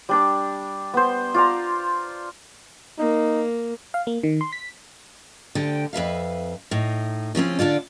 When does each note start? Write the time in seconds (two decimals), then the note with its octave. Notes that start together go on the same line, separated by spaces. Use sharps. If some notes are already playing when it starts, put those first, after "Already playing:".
0.09 G3 D4 D5
0.94 B3 C5
1.34 F4 D5 A#5
2.98 A#3 D#4
3.94 F5
4.07 A#3
4.23 D#3
4.41 C6
4.53 B6
5.55 D2 D3 G4 G5
5.93 F2 B4 E5 F5
6.71 A2 D#4
7.35 C#3 F3 C4 C#4
7.59 D3 D4 F4 D5